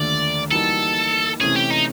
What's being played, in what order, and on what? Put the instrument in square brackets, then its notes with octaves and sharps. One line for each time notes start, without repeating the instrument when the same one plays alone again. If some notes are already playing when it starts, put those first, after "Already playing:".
Already playing: [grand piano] D#2 D3 F3 A3 [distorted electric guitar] D5
[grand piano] E3 G3 A#3 D#4 F#4 [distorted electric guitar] A4
[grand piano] C3 E3 A3 C#4 [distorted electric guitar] G#4
[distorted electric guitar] G4
D#4